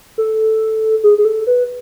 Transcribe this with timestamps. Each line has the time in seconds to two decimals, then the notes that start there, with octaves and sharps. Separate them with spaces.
0.18 A4
1.04 G#4
1.18 G#4
1.25 A4
1.47 B4